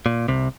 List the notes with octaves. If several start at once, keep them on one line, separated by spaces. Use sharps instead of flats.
A#2
C2 C3